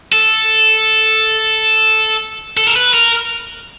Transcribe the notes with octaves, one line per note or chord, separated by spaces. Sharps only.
A4
A4
A#4
B4
A#4